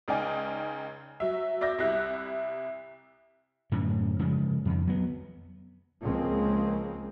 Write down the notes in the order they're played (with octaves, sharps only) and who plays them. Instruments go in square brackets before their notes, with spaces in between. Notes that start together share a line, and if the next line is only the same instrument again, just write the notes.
[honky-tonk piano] C#2 C#3 D#4 D5 G5 G#5
F#3 E5
D5 E5 D6 G6 A#6
C2 G3 E4 E5 F#6
[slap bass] F#2 A2 D3 C#4
C#3 F3 G#3
F2 D#3
F#3 B3
[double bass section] C#2 C#3 F3 G#3 A#3 C4